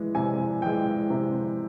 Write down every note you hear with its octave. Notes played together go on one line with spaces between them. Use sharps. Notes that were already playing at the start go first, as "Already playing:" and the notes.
Already playing: E3 G#3
C3 G#5
E3 G#3 G5
C3